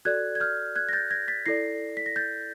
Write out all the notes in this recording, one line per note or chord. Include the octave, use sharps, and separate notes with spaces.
F#4 A4 D5 F#6 G#6
G#6
F6 G6
F#6 G#6
A#6
G6 A6
G#6 A#6
A6 B6
E4 A4 D5 A#6 C7
B6
A#6
G6 A6